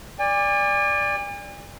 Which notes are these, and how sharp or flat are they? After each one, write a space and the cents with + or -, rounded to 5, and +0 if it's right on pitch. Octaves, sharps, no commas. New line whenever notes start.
D5 +0 G#5 -45